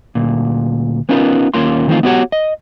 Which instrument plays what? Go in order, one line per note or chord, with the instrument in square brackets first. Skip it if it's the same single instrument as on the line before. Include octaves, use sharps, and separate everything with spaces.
[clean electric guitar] D2 A#2
B3 C#4 D#4 F4 A#4 B4
D#2 A#3 C#4 F4 C6
D#3 E3 A3 C4 D#4 F4
B3 E4 F#4 G4 C#5 F#5
D#5